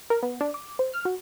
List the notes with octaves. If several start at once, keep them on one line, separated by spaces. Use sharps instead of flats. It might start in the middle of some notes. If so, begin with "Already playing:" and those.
A#4
B3
D4
D6
C5
F6
F#4